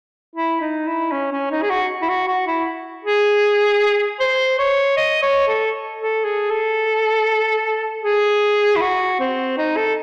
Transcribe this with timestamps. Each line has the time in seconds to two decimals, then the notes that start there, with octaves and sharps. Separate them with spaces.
0.35 E4
0.61 D#4
0.87 E4
1.12 C#4
1.32 C#4
1.51 D#4
1.62 G#4
1.70 F#4
2.01 E4
2.09 F#4
2.27 F#4
2.47 E4
3.05 G#4
4.20 C5
4.59 C#5
4.97 D#5
5.22 C#5
5.48 A4
5.99 A4
6.24 G#4
6.50 A4
8.04 G#4
8.76 E4
8.81 F#4
9.19 C4
9.58 D#4
9.76 A4